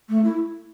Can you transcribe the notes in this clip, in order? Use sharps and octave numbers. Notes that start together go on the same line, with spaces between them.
A3
E4